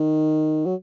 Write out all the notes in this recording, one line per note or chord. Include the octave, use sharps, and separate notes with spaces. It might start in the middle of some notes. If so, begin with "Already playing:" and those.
Already playing: D#3
F#3